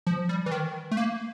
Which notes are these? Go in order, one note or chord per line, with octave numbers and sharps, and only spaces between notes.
F3
G3
E3
D#3
A3
A#3